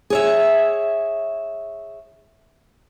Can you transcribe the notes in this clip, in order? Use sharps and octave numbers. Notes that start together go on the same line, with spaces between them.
G#4 C#5 E5